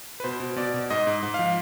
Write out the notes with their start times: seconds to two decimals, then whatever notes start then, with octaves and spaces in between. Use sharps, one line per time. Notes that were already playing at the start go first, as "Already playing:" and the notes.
0.20 B4
0.24 B2 C5
0.40 B2
0.56 B2 D5
0.74 B2
0.90 G#2 D#5
1.07 G#2
1.23 G#2
1.34 F3 F5